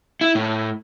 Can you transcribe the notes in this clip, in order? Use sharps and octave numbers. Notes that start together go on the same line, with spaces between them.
E4
A2